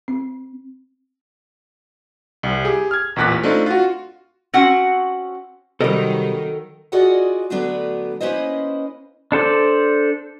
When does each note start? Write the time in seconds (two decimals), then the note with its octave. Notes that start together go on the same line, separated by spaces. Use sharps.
0.08 C4
2.43 C2
2.65 G4 G#4
2.91 F6 G#6
3.16 A1 E2 A#2 F#6 B6
3.43 A3 C4 D4 D#4 F4
3.66 F4 F#4
4.54 C4 C#4 F#4 F#5
5.81 C3 D#3 F#3 G3 A4 A#4 D#5
6.92 F4 F#4 G#4 D5 D#5 F#5
7.50 D2 F#3 A3 B3 D4 B4
8.21 A#3 C#4 E4 B4 C5 D#5
9.32 D4 A4 C5 D5